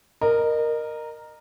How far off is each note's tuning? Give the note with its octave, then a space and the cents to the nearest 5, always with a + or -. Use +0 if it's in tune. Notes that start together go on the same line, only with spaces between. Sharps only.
A#4 +0 D#5 -30